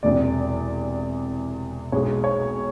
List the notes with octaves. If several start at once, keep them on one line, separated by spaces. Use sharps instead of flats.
E1 E2 C3 D5
B1 B2 G#3 C#5
C#5